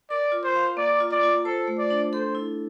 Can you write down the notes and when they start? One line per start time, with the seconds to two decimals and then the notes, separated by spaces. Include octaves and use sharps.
0.10 A#4 D5
0.32 F4
0.44 C5
0.55 F5
0.77 A#3 D5
1.00 F4
1.11 D5
1.23 F4
1.45 A4 C5
1.67 A3
1.79 D5
1.90 D4
2.13 A4 C5
2.35 E4